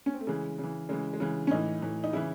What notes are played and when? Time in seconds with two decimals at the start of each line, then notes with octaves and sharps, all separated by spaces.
0.06 C#4
0.13 C4
0.20 A3
0.27 C#3 E3 G#3
0.58 C#3
0.64 E3
0.89 C#3 E3 G#3
1.13 G#3
1.20 C#3 E3
1.47 C#4
1.51 A2 E3 D#4
1.82 A2 E3
2.04 D#4
2.13 C#3 E3 E4